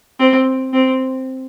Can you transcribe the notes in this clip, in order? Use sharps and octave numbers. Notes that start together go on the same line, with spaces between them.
C4
C4